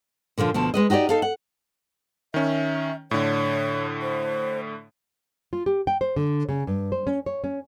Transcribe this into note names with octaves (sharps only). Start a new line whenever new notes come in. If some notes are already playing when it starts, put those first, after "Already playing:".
A#2 D3 F3 F4
D2 B2 F3 A5
G#3 B4 D#5
D#4 F#4 G4 C#5 D5
D#4 A4 F5
F#5
D#3 C#4 E5
A2 D3 C#5
C5
F4
G4
G5
C5
D3
C#3
G2
C5
C#4
C#5
C#4